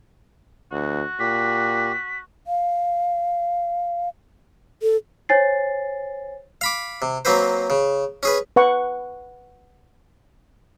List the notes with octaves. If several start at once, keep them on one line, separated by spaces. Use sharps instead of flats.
D2 F#4
A#2 G4 B6
F5
A4
C5 C#5 G#5 A6 C7
F5 B5 D6
C3
F#3 A#3 C4 B4 C5
C#3
C#4 G#4 B4
B4 F#5 C#6